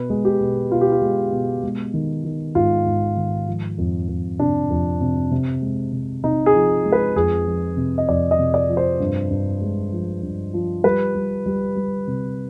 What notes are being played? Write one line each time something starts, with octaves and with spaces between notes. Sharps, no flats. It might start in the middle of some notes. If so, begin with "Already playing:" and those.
Already playing: B2 B4
G#3
G4
B2
B2 F4
G4
F4
G#3
B2
G#3
D#3
D#3
G#2 F4
G#2
D#3
F3
F2
F2
C3 D4
F2
C3
C3
G#3
C3
C3 D#4
G#4
F3
G#3
B4
F2 G#4
F3
C3
D#5
F2 D5
D#5
C3
D5
F3
C5
G2
G2
G#3
F3
G2
F3
G3 B4
G3
G3
G3
C3